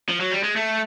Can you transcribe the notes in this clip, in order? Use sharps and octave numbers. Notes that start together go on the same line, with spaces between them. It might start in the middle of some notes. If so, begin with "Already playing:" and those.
F3
F#3
G3
G#3
A3